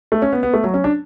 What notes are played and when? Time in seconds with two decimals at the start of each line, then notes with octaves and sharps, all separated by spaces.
0.12 A3
0.22 C#4
0.33 B3
0.43 B3
0.54 A3
0.64 F#3
0.74 C#4
0.84 D4